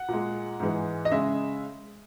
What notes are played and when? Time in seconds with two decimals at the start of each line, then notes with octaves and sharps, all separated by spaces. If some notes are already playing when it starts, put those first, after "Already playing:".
Already playing: F#5
0.09 A#2 G#3
0.60 G#2 E3 G#3
1.05 D#5
1.11 C#3 G#3 E5